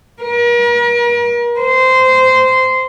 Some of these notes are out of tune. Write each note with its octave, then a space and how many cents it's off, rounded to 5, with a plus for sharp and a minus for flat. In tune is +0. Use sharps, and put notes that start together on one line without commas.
A#4 +45
C5 -15